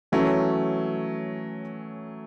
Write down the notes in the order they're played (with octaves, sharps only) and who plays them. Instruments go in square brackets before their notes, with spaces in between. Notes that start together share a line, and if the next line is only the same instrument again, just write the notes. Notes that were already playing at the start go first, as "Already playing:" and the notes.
[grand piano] E3 A3 C#4 [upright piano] F#3